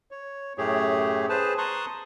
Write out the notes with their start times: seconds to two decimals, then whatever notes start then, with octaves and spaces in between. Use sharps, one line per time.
0.11 C#5
0.58 F#2 A2 A3 G4 G#4 C#5
1.29 G#4 B4 C5 A5
1.58 A5 A#5 C6 C#6 D#6 F#6